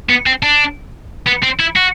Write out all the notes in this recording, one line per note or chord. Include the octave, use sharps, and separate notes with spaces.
B3
C4
D4
B3
C4
E4
F#4